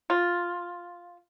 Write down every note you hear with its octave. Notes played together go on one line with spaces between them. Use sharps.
F4